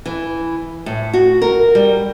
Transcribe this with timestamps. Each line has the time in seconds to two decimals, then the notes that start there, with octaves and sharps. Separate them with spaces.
0.06 E3
0.86 A2
1.14 F#4
1.42 A#4
1.75 G3